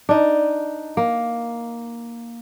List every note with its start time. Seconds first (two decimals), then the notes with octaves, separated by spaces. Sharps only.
0.09 D4 D#4
0.97 A#3